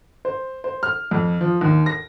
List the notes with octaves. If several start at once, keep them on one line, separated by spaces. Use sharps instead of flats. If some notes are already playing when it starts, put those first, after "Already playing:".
C5
C5
F6
F2
F3
D#2
A#6